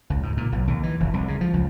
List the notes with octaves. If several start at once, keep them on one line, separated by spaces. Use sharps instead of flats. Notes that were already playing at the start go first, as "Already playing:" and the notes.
C#2
G#2
A#2
B1
D#2
E3
F1
C2
C#3
F3
C#2